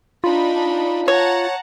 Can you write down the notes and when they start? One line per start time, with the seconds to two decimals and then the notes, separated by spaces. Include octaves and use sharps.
0.24 D4 D#4 F4 B5
1.08 C#5 F#5 A5 A#5